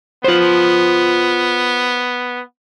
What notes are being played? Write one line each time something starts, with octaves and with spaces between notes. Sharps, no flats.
B3 F4 C5